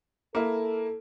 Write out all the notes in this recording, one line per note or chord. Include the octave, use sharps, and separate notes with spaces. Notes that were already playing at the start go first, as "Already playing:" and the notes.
A#3 E4 A4